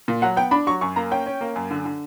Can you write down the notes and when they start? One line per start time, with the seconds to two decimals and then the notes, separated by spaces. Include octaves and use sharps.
0.08 A#2
0.22 F#3 F#5
0.36 B3 G5
0.51 D4 B5
0.67 F#3 C#6
0.81 F#2 C#6
0.96 A#3 A#5
1.11 C#4 G5
1.26 C#4
1.41 A#3
1.56 F#2
1.71 D3
1.85 D3